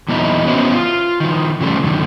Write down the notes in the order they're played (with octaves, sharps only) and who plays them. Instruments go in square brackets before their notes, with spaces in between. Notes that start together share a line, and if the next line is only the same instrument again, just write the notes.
[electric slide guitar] E2 A#2 F#3 D#4 E4
B3 C#4 E4 F#4 A4 C5
F4
D#3 F3
C#3 F3 G3 A3
F#2 D3 D#3